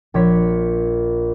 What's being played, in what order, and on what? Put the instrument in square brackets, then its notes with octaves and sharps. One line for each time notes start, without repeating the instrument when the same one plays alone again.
[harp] A#1 C#5 B6